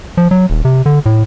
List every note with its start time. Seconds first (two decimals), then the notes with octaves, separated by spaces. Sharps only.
0.17 F3
0.31 F#3
0.50 D#1
0.65 C3
0.86 D3
1.06 A2